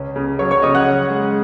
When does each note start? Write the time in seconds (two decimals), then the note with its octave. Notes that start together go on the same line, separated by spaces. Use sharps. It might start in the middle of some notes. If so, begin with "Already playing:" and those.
Already playing: C#2 C#4
0.16 C#3
0.39 F#3 C#5 C#6
0.51 C#5 C#6
0.62 C#3 D#5 D#6
0.75 F#5 F#6
0.87 C#4
1.10 G#3